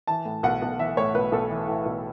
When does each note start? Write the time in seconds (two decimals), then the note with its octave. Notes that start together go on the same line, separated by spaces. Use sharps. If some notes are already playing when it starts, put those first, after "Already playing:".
0.07 E3 A5
0.25 A2
0.43 B1 F#5
0.62 B1
0.79 E3 E5
0.97 A2 C#5
1.14 B1 B4
1.32 B1 A4
1.50 E3
1.68 A2
1.86 B1